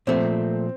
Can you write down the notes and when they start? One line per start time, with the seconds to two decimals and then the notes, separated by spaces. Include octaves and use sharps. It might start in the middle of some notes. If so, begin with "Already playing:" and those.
0.07 A#2 F3 A3 C4